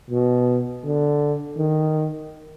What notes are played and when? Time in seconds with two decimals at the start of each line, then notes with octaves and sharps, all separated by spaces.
0.10 B2
0.84 D3
1.57 D#3